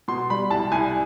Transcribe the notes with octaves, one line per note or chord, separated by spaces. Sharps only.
B2 C6
G3 B5
C2 A5
C2 G#5